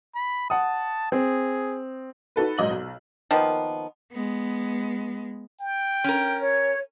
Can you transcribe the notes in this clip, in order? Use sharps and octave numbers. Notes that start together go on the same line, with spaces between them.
B5
F#5 A5 D#6
C4 G#4
D#4 F#4 A4 B4
A#1 G#2 F#3 D#5 F#7
B1
D#3 F3 A#3 B3
G#3 B3
G5
C#4 A#4
C#5